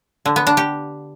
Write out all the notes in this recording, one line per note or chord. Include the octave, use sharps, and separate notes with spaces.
D3
B3
D4
G4